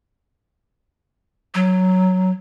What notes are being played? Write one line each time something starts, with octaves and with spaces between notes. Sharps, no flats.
F#3